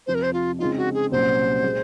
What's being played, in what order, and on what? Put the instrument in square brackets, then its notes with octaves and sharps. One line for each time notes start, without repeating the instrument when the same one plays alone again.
[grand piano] F2 C3 F3 [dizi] C5
[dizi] A#4
C5
F4
[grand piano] C#3 G#3 C4 D#4 [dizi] F4
[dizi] F#4
G#4
[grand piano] C2 A#2 F#3 C#4 [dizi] C5
[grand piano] A#2 G#3